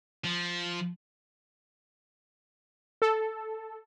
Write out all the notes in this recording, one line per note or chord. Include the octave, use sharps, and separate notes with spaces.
F3
A4